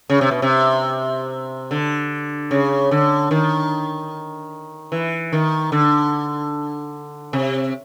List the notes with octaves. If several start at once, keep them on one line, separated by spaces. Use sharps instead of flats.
C#3
C3
B2
C3
D3
C#3
D3
D#3
E3
D#3
D3
C3